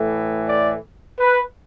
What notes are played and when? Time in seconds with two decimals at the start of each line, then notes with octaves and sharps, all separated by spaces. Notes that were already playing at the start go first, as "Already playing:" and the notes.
Already playing: A2 E3 A3
0.48 D5
1.20 B4